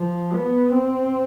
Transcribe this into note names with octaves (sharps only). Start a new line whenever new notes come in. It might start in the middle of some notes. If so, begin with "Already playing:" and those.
Already playing: F3
B3
C4